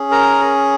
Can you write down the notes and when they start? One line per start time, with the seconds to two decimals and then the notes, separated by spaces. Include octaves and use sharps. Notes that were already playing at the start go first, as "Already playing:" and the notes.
Already playing: C#4 G#4
0.11 A#4 A#5